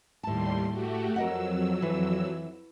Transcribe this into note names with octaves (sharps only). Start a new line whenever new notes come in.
D#2 A2 G3 A5 C6
A3 F#4 G4
F2 F#3 A#4 D#5 F#5 E6
E3